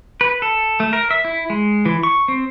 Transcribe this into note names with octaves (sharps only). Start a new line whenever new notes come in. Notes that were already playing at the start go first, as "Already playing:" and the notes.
B4
A4
A3
A#4
E5
E4
G#3
E3
C#6
C4